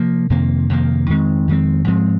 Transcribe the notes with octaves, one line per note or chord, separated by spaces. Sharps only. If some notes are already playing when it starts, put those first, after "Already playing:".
Already playing: C3 F3 A#3
F2 C3 D#3 A#3
F2 C3 D#3 A#3
F2 D#3 G#3 C4
F2 D#3 G#3 C4
G#2 F3 G#3 C4